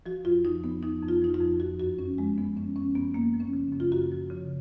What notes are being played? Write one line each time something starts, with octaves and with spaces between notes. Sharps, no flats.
F3 F#4
F2 F4
F3 D#4
F2 B3
F3 D#4
F2
F4
F3 D#4
F4
F2
F3 F#4
F#2 F#4
F3 C#4
F#2 G#3
F3 B3
F#2 C#4
F3 C#4
F#2 B3
F#2 A#3
F3
C#4
C#3
F#2
F4
F#2 F#4
F3
C#3